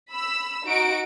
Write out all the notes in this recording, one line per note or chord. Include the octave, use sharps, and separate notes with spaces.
B5 E6
D#4 F#4 D7